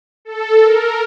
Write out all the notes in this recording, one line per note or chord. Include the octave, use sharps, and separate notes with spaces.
A4
A#4